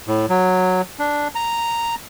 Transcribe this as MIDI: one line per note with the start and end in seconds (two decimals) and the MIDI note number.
0.08 0.26 45
0.29 0.82 54
0.99 1.28 62
1.35 1.95 82